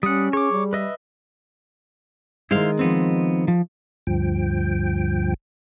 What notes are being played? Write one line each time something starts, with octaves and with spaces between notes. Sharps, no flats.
G3 C#4 F#5 D#6
G#4 C#5 D6
G3
B4 D#5 E5
D#3 G#3 E4 C5 F5
F3 B3 C4
F3
D2 G2 F3 G5